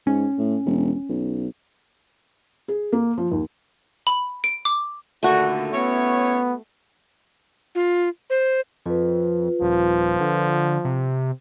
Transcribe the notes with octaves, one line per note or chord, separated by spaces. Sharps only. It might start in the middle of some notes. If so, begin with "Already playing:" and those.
G#2 C#4
A2
E1
B1
G#4
A#3
F3
D#2
B5
D7
D6
D#2 A#2 D3 A3 F#4
B3 C#4 E4 C#5
F4
C5
F2 F4 B4
D#1 F3
D3
C3